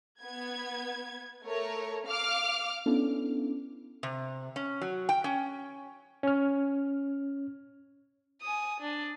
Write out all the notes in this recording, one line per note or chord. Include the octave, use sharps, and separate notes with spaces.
B3 G#6
A3 A#4 C#5
F5 D6 F6
B3 C#4 D4 E4 A4
C3
C#4
F#3
G5
C#4
C#4 F6
G#5 D#6
D4